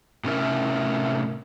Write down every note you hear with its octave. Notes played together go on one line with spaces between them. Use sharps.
A2 C3 C#4 E4 A#4 E5